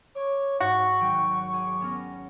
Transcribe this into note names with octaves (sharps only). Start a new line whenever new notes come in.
C#5 D6
G#2 F#4 C#6
G#1 F#3 G5
G#4 D6
B3 C#4 A#4